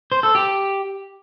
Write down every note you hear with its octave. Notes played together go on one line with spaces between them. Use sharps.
C5
A4
G4